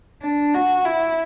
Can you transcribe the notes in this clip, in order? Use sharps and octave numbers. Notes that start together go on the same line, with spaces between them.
D4
F#4
E4